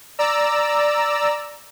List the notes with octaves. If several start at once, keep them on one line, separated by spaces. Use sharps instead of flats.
D5 A#5 E6